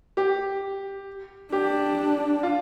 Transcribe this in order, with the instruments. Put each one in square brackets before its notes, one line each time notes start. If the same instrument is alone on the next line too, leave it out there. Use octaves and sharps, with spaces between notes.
[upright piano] G4
[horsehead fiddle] D4 [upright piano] G4
[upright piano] F4